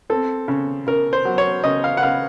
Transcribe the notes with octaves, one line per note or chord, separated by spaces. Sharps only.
C4 A4
C#3
C#3 A#4
C5
F#3
C#5
C#3 D#5
F5
F#5
C#3 F5